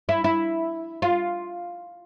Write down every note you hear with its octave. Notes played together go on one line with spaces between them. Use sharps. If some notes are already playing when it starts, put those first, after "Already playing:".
E4
E4
F4